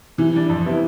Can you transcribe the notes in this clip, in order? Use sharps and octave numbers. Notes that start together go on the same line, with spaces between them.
C3 E3
G3 D4
F2
C3 G3 B3 E4